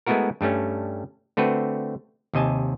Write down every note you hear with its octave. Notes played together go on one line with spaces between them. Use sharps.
G#3 A3 B3 E4 F#4 A#4
G2 G3 A3 C#4
D3 A3 C4 F#4 B4
D#2 C3 D#5 G#5 A5